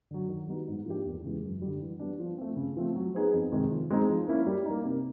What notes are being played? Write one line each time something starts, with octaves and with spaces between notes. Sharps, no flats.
D3 F#3
D#3
G3 B3 D#4 F#4
G#2
F3 A#3 D4 G4
E2
C#3 E3 G#3
F#2
D3 G3
E3
G3 B3 D4
F3
A3 C4
C#3
F3 A3 C4
F#3
B3 D#4 G#4 C5
F2
C3 D#3 G#3
F3
G#3 C4 D#4 G#4
F3
A#3 C#4 E4
G3
A#3 D#4
C3